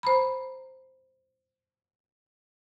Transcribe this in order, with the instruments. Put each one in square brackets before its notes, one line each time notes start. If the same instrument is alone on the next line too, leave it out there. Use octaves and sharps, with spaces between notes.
[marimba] C5 A#5 B5